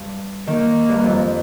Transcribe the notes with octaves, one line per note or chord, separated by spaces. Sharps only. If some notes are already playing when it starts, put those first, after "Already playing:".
Already playing: G2
D#3 A#3
G2
F2